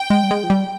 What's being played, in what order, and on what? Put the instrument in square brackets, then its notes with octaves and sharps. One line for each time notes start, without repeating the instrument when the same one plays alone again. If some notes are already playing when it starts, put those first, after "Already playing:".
Already playing: [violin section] G5
[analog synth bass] G#3
G3
G#3
F3
G3